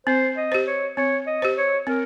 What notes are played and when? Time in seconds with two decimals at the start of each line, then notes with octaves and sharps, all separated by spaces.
0.07 C4 C5
0.37 D#5
0.52 G4 C5
0.67 C#5
0.97 C4 C#5
1.27 D#5
1.42 G4 C5
1.57 C#5
1.87 C4 A#4